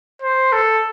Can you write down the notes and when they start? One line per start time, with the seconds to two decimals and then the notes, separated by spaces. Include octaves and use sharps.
0.22 C5
0.52 A4